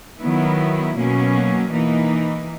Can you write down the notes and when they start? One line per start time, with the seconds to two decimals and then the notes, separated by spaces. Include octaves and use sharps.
0.18 D#3 F#3 B3 E4
0.95 B2 F#3 A#3 C#4
1.71 E3 A#3 D#4